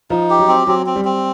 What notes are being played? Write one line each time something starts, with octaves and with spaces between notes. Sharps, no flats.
F3 D#4
G4
F#3
C4
F#3 C4
C4
G3
C4